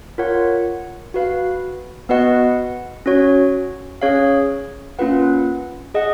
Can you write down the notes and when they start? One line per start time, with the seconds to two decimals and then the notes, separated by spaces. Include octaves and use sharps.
0.18 F4 A#4 C#5 F#5
1.14 F#4 B4 F5
2.09 B3 F#4 B4 D#5 F#5
3.06 C#4 F#4 C#5
4.01 C#4 G#4 C#5 F5
4.99 A#3 C#4 F4 B4 F#5
5.94 G#4 D#5 F#5